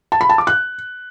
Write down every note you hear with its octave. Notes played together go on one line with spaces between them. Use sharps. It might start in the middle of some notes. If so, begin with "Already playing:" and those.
A5
B5
A5
D6
F#6